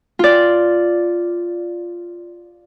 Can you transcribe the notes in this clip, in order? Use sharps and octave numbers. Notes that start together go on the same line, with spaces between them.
F4 D5